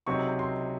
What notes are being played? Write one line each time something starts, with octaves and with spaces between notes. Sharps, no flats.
C#2 C3 F#3 C4 D#4 C#6
C6